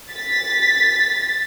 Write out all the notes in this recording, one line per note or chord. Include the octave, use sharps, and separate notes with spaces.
A6 B6